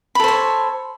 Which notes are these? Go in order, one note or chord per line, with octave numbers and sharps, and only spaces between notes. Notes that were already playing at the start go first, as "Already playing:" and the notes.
A4 C5 C#5 B5